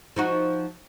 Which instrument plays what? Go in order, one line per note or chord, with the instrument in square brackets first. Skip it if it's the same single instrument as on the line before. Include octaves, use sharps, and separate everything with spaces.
[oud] F3 D#4 F#4